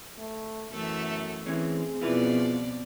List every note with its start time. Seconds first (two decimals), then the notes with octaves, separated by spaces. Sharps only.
0.18 A3
0.72 F#2 E3 A3 A4
1.46 E3 C4 C#4 G#4
2.01 F2 B2 E4 F4 B4 D5